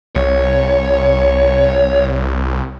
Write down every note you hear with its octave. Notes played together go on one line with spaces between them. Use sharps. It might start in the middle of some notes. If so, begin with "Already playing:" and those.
C2 C#5